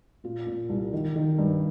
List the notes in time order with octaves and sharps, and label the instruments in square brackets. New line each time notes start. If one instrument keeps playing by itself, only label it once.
[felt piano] A#2 F4
A#2
C2
D#3
D#3
G2